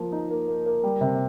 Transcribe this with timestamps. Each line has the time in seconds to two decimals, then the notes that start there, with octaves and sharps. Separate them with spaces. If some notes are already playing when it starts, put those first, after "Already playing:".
Already playing: F3 A#3
0.12 D#4
0.30 A#3
0.48 A#3
0.66 A#3
0.84 G3
1.01 C3